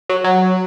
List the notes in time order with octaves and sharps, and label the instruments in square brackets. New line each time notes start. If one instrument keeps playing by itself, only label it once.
[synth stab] F#3
F#3